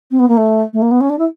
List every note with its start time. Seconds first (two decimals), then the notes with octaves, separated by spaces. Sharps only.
0.11 C4
0.19 B3
0.28 A#3
0.37 A3
0.73 A3
0.82 A#3
0.91 B3
1.01 C#4
1.10 D4
1.19 E4